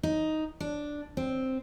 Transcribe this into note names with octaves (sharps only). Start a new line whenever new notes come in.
D#4
D4
C4